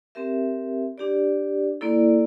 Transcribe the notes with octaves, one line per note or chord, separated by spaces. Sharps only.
C4 G4 A#4 E5
D4 G4 D5
A#3 E4 A4 D5